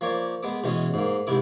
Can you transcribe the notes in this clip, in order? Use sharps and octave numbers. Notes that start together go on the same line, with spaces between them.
F3 A#3 C#5 D5
G#3 B3 D6
B2 E3 G#3 C#4
G#2 A#3
G#2 C3 E4 D6